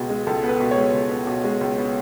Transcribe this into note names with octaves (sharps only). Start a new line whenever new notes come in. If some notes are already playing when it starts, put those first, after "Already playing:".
Already playing: C#2 B2 B3 G#4
G#3
C#2 A4
B3
B4
B2
C#5
G#3
C#2
B3
B2
G#3
C#2
B3